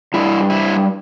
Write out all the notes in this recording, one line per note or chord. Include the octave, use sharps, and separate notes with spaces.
G2 G3 E4
E4